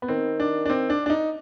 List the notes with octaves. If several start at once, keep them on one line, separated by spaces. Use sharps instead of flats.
B3
D#3 C4
D4
D4
C4
D4
D4
D#4